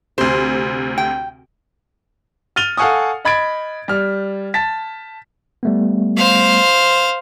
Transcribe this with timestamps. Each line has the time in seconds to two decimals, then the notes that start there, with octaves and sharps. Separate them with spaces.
0.18 D2 C3 C5
0.98 G5
2.56 F6 A6 D#7 F7 G7
2.77 A4 F5 F#5 G#5 C#6 D#6
3.25 D#5 B5 G#6 A6 D7
3.88 G3 F6
4.54 A5 A6 B6
5.63 G3 A3 B3
6.17 C5 F5